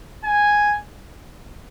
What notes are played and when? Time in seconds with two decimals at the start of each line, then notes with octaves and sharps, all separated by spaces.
0.25 G#5